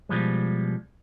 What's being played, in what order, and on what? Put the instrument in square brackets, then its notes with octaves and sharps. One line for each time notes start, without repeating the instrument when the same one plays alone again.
[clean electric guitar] B2 F3 G3 G#3